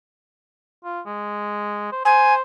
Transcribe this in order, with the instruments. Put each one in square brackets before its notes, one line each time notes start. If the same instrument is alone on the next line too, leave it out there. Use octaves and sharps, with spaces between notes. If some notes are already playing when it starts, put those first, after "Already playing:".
[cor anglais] F4
G#3
C5
[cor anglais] C5 [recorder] G#5